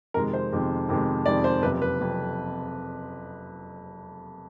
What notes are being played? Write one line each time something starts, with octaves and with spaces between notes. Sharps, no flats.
F2 C3 D#3 G#3 A#4
C5
F2 C3 D#3 G#3
F2 C3 D#3 G#3
F2 C3 D#3 G#3 D5
C5
F#1 F2 C3 B4
B4
F#1 F2 C3